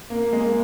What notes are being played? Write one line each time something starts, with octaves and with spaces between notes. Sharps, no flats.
A#3
G#3
A#3